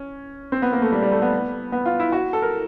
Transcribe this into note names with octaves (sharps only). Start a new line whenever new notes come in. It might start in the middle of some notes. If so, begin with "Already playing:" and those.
Already playing: C#4
C4
B3
A#3
A3
G3
G3
A3
B3
B3
F4
E4
F#4
A4
A#4